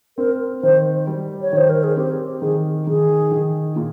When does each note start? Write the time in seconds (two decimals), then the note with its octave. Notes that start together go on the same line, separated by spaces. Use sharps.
0.18 C4 A#4
0.63 D#3 C5
1.07 G3
1.42 C#5
1.53 D#3 C5
1.69 A#4
1.84 G#4
1.97 C4 G4
2.42 D#3 G#4
2.87 D#3 G#4
3.32 D#3
3.76 A#2